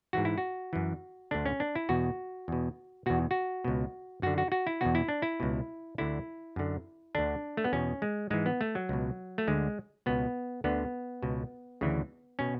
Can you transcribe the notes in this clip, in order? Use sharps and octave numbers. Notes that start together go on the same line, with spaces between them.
G#2 E3 F#4
E4
F#4
F#2 E3
D2 D3 D4
C#4
D4
E4
E2 B2 F#4
E2 B2
E2 B2 F#4
F#4
C#2 B2
F#2 D3 F#4
F#4
F#4
E4
E2 B2 F#4
E4
D4
E4
C#2 B2
D2 D3 E4
F#2 D3
D2 D3 D4
A3
B3
E2 B2 C#4
G#3
G#2 E3 G#3
B3
A3
F#3
C#2 B2
A3
D2 D3 G#3
C#2 B2 B3
D2 D3 B3
C#2 B2
D2 C#3 E3
B2 C#4